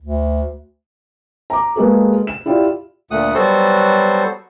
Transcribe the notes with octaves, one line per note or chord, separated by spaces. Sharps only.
D2
A#5 D6
G#3 A#3 B3 F#4 G#4 A4
E7
E4 F4 G4 D5
D2 A#2 A3 F#5 D#6
F#3 G3 B3 F#4 A4 C5